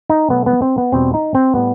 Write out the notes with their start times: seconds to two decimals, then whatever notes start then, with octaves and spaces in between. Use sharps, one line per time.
0.10 D#4
0.30 B2 F#3 A3 B3
0.46 B3
0.62 C4
0.78 B3
0.92 E2 B2 G3 C4
1.14 D#4
1.35 C4
1.55 A2 G3 B3